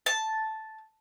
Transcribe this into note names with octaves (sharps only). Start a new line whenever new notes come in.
A5